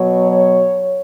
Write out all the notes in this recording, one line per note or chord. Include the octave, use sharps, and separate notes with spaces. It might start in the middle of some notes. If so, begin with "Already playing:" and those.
Already playing: B2 F#3 C#5
C#5